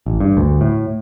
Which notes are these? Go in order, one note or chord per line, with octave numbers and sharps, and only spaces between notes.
A1
G2
D2
A2